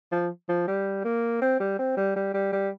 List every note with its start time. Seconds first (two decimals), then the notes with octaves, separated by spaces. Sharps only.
0.12 F3
0.49 F3
0.68 G3
1.04 A#3
1.42 C4
1.60 G3
1.79 C4
1.97 G3
2.16 G3
2.34 G3
2.52 G3